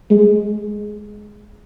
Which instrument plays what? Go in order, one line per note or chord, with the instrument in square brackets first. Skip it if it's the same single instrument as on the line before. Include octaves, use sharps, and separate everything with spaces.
[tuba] G#3